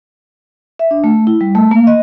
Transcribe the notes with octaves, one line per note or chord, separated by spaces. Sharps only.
E5
D4
A3
E4
G3
A3
A#3
D#5